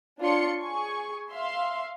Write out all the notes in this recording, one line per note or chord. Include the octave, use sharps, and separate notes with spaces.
D4 F4 C#5 C6 C#7
G#4 G#5 C#6
E5 F5 C6